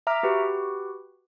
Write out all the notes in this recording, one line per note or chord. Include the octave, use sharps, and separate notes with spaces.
E5 A#5 D6 F6 D7
F#4 G4 B4